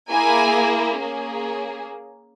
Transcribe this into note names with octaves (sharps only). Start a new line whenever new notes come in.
A#3 E4 G#4 G#5
A#3 C#4 G#4